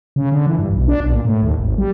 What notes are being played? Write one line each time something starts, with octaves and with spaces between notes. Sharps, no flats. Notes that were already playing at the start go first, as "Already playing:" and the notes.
C#3
D3
E3
G2
B1
D4
B1
A#2
A2
D#2
G#1
G3